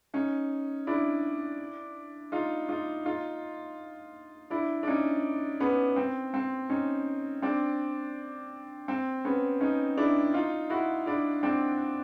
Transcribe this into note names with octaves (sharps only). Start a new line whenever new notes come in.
C#4 D#4
D4 E4
D#4 F4
D#4 F4
D#4 F4
D4 E4
D4
C#4 D#4
B3 C#4
C4
C4
C#4 D#4
C4 D4
C4
B3 C#4
C#4 D#4
D4 E4
D#4 F4
E4 F#4
D4 E4
C4 D4